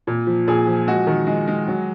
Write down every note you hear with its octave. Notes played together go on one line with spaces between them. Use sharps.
A#2
F3
A#2 G#4
F3
G#3 F#4
D#3
G#3
G#3
F#3